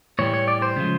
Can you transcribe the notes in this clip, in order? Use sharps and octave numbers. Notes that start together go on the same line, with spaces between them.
A2 E3 G3 C#5
C#5
D5
C5
C#3 F3 G#3